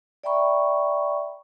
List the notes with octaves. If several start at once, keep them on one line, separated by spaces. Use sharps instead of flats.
D5 E5 G5 A#5 B5 C#6